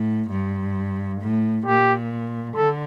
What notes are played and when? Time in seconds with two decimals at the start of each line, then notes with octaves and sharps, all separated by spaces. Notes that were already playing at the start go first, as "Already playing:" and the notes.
Already playing: A2
0.31 G2
1.21 A2
1.66 A#2 G4
2.56 D3 A4